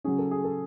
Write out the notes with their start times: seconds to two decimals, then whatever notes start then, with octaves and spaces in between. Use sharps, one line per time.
0.04 C#3 F#3 C#4 G#4
0.19 A4
0.31 G#4
0.44 A4